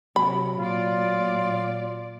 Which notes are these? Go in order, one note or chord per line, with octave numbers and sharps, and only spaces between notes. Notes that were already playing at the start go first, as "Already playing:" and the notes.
C3 F#3 B5
A#2 F4 D5